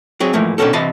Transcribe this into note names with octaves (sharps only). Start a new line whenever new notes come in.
F#3 C4 G#4
G#2 E3 F3 A3 A#3
B2 D3 D#3 B3 C#4 A4
C2 C3 E3 D#5 A5 B5